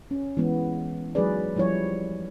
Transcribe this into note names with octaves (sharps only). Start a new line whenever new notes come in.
C#4
E3 G#3 B3
F#3 G#3 D#4 G#4 B4 D5
F3 G3 E4 C#5